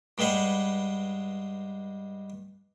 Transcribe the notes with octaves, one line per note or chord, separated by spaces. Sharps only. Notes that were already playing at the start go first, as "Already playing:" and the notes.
G2 G3 G#3 B4 C5 F#5